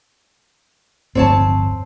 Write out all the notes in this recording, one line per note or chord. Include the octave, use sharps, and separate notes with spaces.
D1 G1 F2 C4 C#5 A5